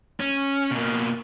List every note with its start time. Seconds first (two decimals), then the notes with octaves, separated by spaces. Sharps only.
0.20 C#4
0.71 B2 A#3